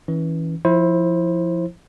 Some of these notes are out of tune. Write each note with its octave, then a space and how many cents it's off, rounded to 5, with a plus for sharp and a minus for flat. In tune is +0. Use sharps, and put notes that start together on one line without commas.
E3 -20 C#4 +0
F3 -10 E4 +0 C5 +20